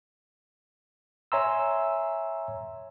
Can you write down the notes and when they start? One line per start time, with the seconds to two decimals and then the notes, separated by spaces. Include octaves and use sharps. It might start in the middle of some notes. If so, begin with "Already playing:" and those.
1.32 C#5 E5 G#5 A#5 C6 E6